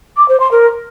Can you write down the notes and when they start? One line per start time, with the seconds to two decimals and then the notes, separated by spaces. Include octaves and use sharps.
0.17 D6
0.28 C5
0.40 C6
0.51 A#4